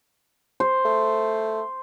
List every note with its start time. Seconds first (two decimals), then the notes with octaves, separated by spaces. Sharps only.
0.60 C5
0.85 A3